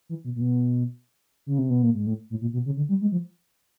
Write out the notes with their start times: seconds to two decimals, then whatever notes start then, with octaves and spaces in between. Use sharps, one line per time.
0.09 E3
0.24 B2
0.35 A#2
0.41 B2
1.46 C#3
1.59 C3
1.70 B2
1.83 A#2
1.94 G#2
2.06 A2
2.30 A2
2.41 A#2
2.53 B2
2.66 C#3
2.77 D3
2.89 G3
3.01 G#3
3.12 F3